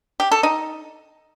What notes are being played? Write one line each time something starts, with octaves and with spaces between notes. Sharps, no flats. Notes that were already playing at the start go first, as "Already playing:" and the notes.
G4
A4
D#4